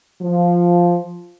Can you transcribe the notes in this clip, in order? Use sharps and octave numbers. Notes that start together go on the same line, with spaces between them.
F3